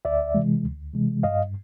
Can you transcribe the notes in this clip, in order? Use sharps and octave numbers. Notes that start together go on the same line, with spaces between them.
D2 D5 E5
C3 E3 G#3
D2
C3 E3 G#3
G2 D#5 F5